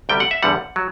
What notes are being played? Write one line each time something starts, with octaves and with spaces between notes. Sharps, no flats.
D2 C3 G3 G5
F#5
E5
E2 D3 G3 F#5
F#3